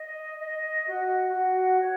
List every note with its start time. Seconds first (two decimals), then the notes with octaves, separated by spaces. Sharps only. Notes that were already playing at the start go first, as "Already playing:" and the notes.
Already playing: D#5
0.39 D#5
0.87 F#4
1.33 F#4
1.80 C#5